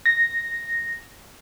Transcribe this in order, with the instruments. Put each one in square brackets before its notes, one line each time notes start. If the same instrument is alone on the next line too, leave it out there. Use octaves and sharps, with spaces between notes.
[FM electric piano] A#6